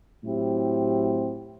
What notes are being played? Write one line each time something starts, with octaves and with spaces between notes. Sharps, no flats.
A2 F#3 C4 E4 G4